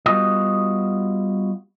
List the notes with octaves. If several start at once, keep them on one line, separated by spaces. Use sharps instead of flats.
G3 B3 F4 F#4 D#5